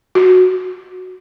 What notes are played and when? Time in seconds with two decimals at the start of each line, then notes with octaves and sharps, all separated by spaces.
0.15 F#4